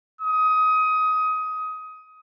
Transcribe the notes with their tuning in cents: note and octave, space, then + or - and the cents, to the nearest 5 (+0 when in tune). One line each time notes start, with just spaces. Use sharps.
D#6 +20